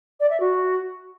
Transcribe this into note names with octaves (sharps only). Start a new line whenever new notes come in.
D5
E5
F#4